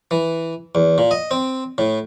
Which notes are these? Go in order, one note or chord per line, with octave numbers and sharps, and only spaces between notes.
E3
E2
A#2
D#5
C4
A2